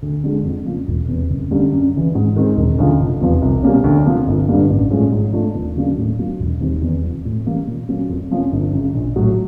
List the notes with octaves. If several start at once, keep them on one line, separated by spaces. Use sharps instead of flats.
D2
D3 F3 G#3
F2
C#3 F3 A#3
E1
E2 C3
F#1
F#2 D3 G3 A#3
F#2
C#3 E3
G#2
D#3 G#3 C4
E1
D2 C#3 F3
F1
E2 C3 F3
C2
B2 G3 A#3 C#4
D2
C3 F3 A#3
G1
G2 D3 G3 A#3
A1
A2 F3 G#3 C#4
G#2
F3 A3 D4 F4
D#2
C#3 F#3 A#3 D4
A2
F#3 A#3 D4 F4
E1
D#2 D#3 G3 C4
E2
C3 F3
A2
E3 G3 A#3 C#4
A#2
F#3 A#3 C#4
F2
C3 F3 A#3 C#4
G1
F#2 C#3
A#1
A2 F#3